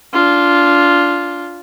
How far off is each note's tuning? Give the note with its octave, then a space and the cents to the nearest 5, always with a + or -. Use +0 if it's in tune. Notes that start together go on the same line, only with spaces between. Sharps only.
D4 -20 F4 +0